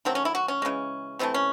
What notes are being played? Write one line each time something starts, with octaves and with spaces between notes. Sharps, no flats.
D#3 F#3 A3 C4
C#4
E4
F#4
C#4
C#3 E3 G#3
C3 E3 A3 C4
C#4